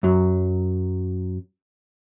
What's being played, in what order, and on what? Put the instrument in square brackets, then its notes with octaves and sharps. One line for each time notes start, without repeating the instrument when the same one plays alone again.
[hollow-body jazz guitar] F#2 F#3